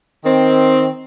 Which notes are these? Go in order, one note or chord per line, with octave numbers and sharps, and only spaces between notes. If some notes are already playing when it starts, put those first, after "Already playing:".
D#3 C4